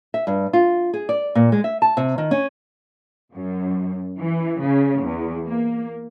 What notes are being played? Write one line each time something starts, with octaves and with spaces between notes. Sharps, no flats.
E5
G2
F4
G#4
D5
A#2
G#3
E5
A5
C3
D#3
C#4
F#2
E3
C#3
E2
A#3